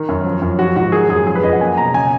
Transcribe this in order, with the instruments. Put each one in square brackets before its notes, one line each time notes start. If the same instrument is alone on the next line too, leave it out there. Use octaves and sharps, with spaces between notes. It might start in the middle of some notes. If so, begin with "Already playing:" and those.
Already playing: [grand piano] D#3
F#2
F3
F#2
F3 F#4
G#2 F#4
D#3 G#4
F#2 G#4
F3 G#4
B4
F#2 D#5
F#5
A#3 G#5
B2 A#5
C#3 G#5